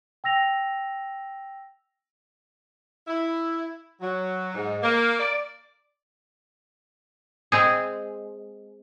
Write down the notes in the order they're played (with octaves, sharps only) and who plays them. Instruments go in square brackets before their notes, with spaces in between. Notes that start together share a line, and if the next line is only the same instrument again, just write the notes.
[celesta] G5 E6 A#6 F7
[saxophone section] E4
F#3
G#2
A#3
D5
[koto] G#3 C4 G#4